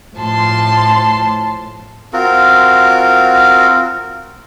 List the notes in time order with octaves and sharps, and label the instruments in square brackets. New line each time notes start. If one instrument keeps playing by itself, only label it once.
[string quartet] A2 F3 A5 C6
[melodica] C4 F4 F#4 A#4